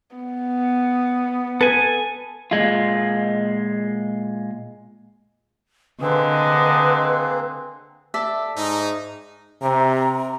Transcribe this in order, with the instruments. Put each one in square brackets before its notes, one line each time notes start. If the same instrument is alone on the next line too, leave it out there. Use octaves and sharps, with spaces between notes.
[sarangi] B3
[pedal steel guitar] A4 G#5 [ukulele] B4
[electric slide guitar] A#2 G#3 F4
[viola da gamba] D3 [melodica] A#3 C4 G#4 [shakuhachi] B4 [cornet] D#5
[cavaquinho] A4 D5 E5
[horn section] G#2 D#4
[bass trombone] C3 [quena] A#5